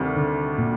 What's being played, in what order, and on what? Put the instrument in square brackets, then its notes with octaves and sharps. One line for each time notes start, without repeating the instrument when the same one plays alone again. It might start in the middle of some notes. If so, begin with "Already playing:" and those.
Already playing: [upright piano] D2 C3 D#3 G3
[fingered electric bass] D3
A#2